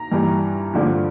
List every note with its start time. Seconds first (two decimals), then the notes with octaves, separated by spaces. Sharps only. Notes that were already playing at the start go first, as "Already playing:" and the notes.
Already playing: A#5
0.12 G2 E3 G3
0.74 G2 D3 F3